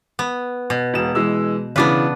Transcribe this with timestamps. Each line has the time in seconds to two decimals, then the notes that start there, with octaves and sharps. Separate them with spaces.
0.19 B3
0.70 B2
0.94 E1 E7
1.15 E3 G#3 E6
1.76 C#3 E3 B3 D4 B4